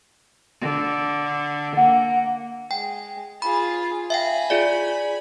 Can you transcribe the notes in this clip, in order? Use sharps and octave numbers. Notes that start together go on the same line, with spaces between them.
D3
A#3 F#5
G#3 G5
F4 G#4 B5
E5 F5 G5 G#5 B5
F4 G#4 D5